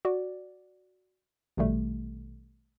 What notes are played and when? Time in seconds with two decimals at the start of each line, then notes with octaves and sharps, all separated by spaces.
0.05 F#4 D5
1.57 A#1 B2 D#3 G3 A3